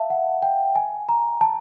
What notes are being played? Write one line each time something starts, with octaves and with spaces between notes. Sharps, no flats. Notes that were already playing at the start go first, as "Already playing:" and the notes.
Already playing: E5 F5 A5
F#5
G5
G#5
A#5
A5